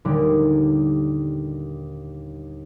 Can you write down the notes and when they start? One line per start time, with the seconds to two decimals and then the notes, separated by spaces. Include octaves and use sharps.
0.05 D#2 A#2 D3 G3